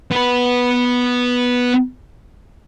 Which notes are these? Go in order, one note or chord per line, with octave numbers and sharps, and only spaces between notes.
B3 B4